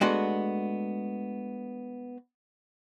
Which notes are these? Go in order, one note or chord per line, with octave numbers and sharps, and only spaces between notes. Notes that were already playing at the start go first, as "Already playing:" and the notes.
G#3 A3 B3 D4 F#4